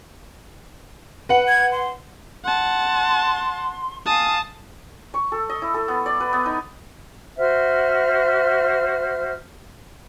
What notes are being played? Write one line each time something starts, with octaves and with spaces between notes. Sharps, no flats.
B4 F#5
G#6
C6
F#5 A5 C6
F5 G#5 A5 D#6
C#6
A4
D#5
E4
A4
B3
D5
B4
B3
D#4
F#4 C5 E5 F6